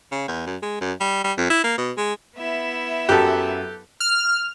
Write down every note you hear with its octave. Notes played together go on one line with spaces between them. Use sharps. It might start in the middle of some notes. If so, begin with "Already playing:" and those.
C#3
E2
F#2
G#3
F#2
G3
G3
F2
E4
A#3
B2
G#3
B3 E4 E5
F#2 F#3 G4 A4 F#6
F6